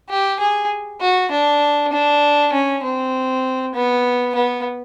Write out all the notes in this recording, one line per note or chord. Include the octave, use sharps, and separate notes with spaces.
G4
G#4
F#4
D4
D4
C#4
C4
B3
B3